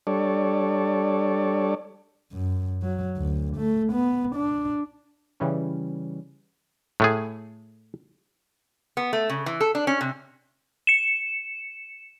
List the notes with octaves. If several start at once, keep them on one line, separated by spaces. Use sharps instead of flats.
G3 D4 A4 C#5 D5
F#2
F#3
D2
A3
B3
D4
C#3 E3 G3 C#4
A2 A3 G#4
B3
A3
C#3
E3
A4
D4
C#4
C3
C#7 E7